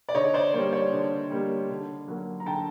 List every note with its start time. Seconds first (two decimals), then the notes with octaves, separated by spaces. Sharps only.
0.09 D5
0.15 D3 C#5 D#5
0.34 C5 D5
0.54 G3 A#3 C#5
0.73 C#5
0.92 D3
1.30 G3 A#3
1.69 D3
2.08 F#3 A#3
2.40 A#5
2.46 D3 G5 A5